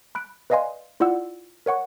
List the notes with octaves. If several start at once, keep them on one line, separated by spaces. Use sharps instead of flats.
B5 F#6 D7
B4 D5 D#5 F5 G#5 C6
E4 F4 D5 F#5 E6
A#4 C#5 F#5 C#6